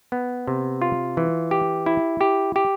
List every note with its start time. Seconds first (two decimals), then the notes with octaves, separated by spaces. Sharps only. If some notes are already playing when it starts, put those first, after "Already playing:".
0.12 B3
0.48 C3
0.82 F4
1.17 E3
1.51 G4
1.86 E4
2.21 G4
2.56 G4